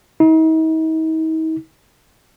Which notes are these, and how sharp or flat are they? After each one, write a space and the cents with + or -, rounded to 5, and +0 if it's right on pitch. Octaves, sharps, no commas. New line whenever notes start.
D#4 +45